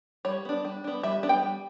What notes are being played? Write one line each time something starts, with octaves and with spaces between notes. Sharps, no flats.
G3 C#5
B3 D4
G3
B3 D4
G3 E5
B3 D4
G5
G3